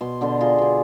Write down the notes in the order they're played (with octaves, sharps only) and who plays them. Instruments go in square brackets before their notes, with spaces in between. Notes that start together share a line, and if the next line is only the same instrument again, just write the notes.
[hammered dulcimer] B2 C6
B2 D3 B4 C6
F4 G#4 A#5 C6
B2 D3